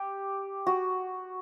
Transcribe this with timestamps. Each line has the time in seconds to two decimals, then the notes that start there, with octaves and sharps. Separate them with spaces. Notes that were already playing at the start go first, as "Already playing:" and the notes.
Already playing: G4
0.67 F#4